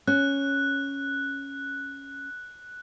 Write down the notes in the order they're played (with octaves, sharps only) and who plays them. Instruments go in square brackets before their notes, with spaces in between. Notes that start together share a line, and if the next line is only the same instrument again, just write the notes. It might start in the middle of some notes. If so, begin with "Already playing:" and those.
[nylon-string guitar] C#4 [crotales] F#6